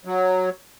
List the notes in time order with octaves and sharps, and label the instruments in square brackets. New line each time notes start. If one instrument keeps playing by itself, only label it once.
[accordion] F#3